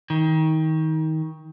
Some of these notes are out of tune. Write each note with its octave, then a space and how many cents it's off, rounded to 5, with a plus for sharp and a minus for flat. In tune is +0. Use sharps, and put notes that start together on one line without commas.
D#3 +25